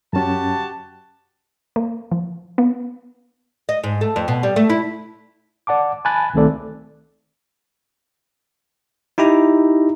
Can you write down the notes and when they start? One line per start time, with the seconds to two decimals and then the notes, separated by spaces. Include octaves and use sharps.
0.13 F#2 C#4 F#4 G4 A5
1.76 A#3
2.11 F3
2.58 B3
3.69 D#5
3.84 G#2
4.01 A3
4.16 F2
4.28 B2
4.43 G3
4.56 A3
4.70 E4
5.67 D5 F#5 A5 D6
6.05 G#5 A5 B5 F#6 A6
6.34 C2 D#3 A3 C4 A4 D5
9.18 D#4 E4 G4 A#5